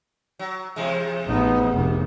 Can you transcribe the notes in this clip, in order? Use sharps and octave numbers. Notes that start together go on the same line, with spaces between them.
F#3
E2 C3 G#3
A1 B3 D#4
F1